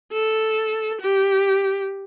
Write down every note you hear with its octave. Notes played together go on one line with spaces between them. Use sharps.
A4
G4